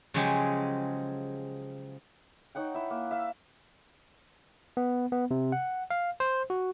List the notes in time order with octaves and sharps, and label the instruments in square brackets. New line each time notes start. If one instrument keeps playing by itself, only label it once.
[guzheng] C#3 F3 F#3 G#3 G4
[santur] D#4 C#5 F#5 G5
E4 E5
A#3
E5 F5
[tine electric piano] B3
B3
C3
F#5
F5
C5
F#4